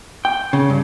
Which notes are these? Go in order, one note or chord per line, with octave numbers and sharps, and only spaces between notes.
G5
C#3
G2